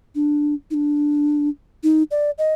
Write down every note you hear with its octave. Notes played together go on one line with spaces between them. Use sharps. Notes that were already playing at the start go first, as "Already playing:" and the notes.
D4
D#4
D4
D#4
D5
D#5